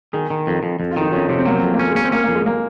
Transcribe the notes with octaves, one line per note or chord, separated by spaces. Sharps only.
D#3 G#4
D#3
F2
F2
F2
F4
D#3 D#4
F2 C#4
C3 C#4
C4
F#3 A#3
C4
F2
A#3
C4 C#4
G#3
A#3 C#4
C4
A#3 C#4
F2 A#3
G#3
A#3